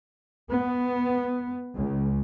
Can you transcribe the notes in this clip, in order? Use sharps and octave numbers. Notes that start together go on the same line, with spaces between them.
B3
C#2